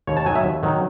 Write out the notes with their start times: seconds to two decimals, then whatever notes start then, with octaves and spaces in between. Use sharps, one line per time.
0.07 D#2 C#5
0.17 A5
0.26 F#3 G#5
0.30 D#3
0.35 E5
0.43 D#2
0.63 D#3 F#3